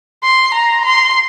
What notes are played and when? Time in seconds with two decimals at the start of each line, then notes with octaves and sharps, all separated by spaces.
0.23 C6
0.54 A#5
0.85 C6